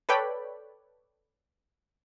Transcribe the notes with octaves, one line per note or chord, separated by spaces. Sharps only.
A4 B4 C#5 D5 G5 B5